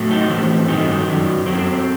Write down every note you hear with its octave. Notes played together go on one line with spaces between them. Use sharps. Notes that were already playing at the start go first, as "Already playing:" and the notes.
Already playing: A2 F#3
D#4
A2 E3 C4
G2 D#3 F#3 D#4
F#2 F#3
F#2 F#3 C4